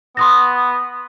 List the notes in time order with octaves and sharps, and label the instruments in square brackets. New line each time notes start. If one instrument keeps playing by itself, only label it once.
[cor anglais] B3 [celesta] C6 D#6 A#6